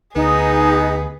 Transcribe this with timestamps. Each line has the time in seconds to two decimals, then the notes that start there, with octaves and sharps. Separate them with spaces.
0.16 D2 B3 D#4 G#4